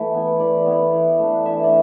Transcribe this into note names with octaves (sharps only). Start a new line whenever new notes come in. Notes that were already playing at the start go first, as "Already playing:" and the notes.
Already playing: E3 A3
B3 E4
E3 D5
B3 E4
E3
A3 D4
E3 E5
D5